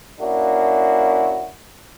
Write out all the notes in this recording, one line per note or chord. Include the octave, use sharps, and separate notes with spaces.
A#3 C#4 D4 E4 F#4